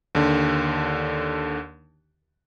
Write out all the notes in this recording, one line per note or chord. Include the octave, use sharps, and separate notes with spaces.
D#2 D3